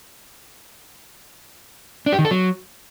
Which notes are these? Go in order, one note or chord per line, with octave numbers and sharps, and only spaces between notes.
D4
G4
D#3
A4
F#3